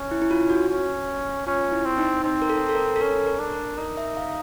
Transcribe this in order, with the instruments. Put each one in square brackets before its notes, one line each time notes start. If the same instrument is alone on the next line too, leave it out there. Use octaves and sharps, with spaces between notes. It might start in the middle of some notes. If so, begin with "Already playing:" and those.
Already playing: [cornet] C#4
[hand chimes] E4
E4
F4
F#4
[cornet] C#4
[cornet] C#4 [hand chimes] F4
[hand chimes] E4
[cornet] C4
[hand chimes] D#4
[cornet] C4 [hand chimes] D#4
[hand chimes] A#4
A4
A4
A#4
A4
[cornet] C#4 [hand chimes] A#4
[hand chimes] A#4
[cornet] D4
[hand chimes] A#4
[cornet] D#4 [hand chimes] A#4
[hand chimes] E5
F5